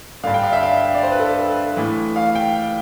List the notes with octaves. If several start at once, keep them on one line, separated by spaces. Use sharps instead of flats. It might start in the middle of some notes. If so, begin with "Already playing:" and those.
G2 D3 F5
G5
F5
E5
F5
E5
D5
C5
B4
A4
A4
A2 E3
F5
G5